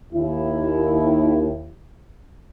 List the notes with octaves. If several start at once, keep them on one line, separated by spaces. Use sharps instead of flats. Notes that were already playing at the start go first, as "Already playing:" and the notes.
D#2 E4